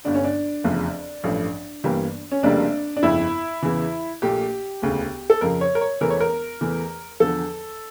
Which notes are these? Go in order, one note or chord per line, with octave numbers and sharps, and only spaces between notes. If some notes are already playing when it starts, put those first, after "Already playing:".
G1 G2 D3 D4
C#4
D4
F1 E2 C#3 F3
A1 G2 F3 A3
G1 G2 E3 G3 A#3
C#4
F1 F2 C#3 G3 A#3 D4
D4
G1 F2 C#3 E4
E2 C#3 E3
A#1 A#2 A3 G4
E1 D2 C#3
A4
F2 C#3 F3 A#4
C#5
A#4
C#5
E1 E2 E3 A3 A#4
C#5
A#4
E2 E3 A3
E2 D3 F3 A4